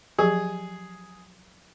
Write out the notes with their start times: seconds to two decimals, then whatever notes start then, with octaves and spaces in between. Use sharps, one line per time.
0.18 F3 F#3 G4 G#4